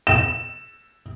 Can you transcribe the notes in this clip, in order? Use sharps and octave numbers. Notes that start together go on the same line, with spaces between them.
E7